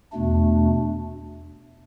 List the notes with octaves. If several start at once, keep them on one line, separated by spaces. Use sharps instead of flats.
E2 B2 A3 D4